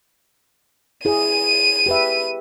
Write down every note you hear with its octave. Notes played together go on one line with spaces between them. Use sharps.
E4 G#4 D#7
G4 B4 E5